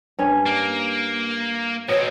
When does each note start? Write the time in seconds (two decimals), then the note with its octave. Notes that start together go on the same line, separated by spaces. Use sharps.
0.19 G2 C#4 C#5
0.46 A#3
1.89 G#2 B2 C4 C#5 D#5